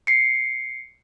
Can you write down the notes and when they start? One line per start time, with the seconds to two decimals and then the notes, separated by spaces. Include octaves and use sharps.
0.07 C7 C#7